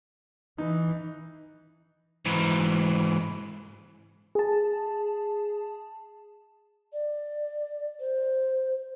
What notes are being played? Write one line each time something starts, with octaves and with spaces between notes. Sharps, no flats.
E3 D#4
G#2 E3
G#4 A5
D5
C5